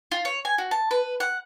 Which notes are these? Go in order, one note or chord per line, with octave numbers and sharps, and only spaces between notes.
F4
C#5
G#5
F#4
A5
B4
F#5